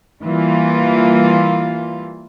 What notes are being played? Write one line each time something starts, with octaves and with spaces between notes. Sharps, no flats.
E3 G3 A#3 F4